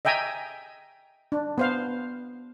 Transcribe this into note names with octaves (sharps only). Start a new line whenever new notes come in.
D#5 E5 G5 G#5 A#5
D4
B3 C5 F5